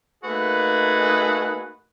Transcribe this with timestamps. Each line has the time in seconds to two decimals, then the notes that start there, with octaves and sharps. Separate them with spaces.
0.24 A3 A#3 D#4 F#4 G#4 B4